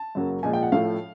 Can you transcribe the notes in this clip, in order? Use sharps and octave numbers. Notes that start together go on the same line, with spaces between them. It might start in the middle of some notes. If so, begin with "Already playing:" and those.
Already playing: A5
F#2 C#3 F#3 A#3
A#2 F3 G#3 G#5
G5
F#5
A2 F3 A3 F5